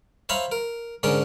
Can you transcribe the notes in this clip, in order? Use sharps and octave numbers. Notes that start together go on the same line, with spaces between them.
C5 C#5 E5 F5 A#5 B5
A#4
G#2 D3 C#4 A#4 D#5